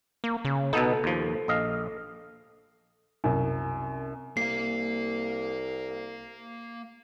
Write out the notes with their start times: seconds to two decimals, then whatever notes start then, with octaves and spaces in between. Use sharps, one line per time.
0.24 A#3
0.45 C#3
0.73 B2 B3 D#4 A4
1.04 D#2 F3
1.48 A#1 D#5 F5
3.24 C2 F#2
4.37 C2 A#3 F5 C7